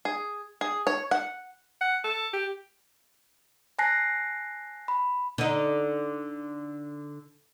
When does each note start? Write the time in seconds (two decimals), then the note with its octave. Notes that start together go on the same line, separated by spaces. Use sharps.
0.05 G#4
0.61 G#4
0.87 C#5
1.11 F#5
1.81 F#5
2.04 A4
2.34 G4
3.79 G#5 A5 F#6 A#6 C7
4.88 B5
5.38 D3 D#4